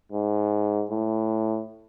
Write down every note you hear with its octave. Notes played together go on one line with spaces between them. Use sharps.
G#2
A2